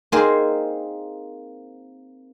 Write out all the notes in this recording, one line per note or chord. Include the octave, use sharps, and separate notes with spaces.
A#3 C4 D#4 G#4 A#4 C5